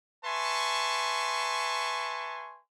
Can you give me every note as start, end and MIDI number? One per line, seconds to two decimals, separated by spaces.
0.25 2.60 71
0.25 2.60 76
0.25 2.60 80
0.25 2.60 81
0.25 2.60 84
0.25 2.60 85